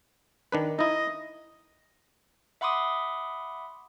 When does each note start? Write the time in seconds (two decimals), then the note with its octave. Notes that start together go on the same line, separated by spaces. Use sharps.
0.52 D#3 D4 B4
0.79 D#4 E4 D#5
2.61 E5 F#5 B5 C6 D6 D#6